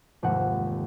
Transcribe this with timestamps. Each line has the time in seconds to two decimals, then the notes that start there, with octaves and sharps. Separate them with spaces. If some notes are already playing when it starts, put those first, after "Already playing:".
0.23 F1 D#2 G#2 F#5